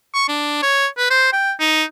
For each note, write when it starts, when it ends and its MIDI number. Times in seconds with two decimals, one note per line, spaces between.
0.14 0.26 85
0.28 0.61 62
0.63 0.87 73
0.98 1.08 71
1.10 1.30 72
1.33 1.52 79
1.60 1.83 63